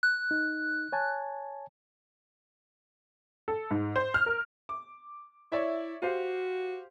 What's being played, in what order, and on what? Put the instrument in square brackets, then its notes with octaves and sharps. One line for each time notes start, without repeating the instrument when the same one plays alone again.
[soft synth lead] F#6
[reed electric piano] D#4
C#5 G#5 A5
[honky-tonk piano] A4
G#2
C5
F6
A#4
[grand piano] D6
[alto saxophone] E4 [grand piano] C#5 D5 E5
[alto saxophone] F#4 [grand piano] G4 C5 F5